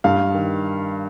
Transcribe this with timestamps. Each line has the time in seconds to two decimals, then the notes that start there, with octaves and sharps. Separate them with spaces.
0.04 G2 F5
0.34 D#3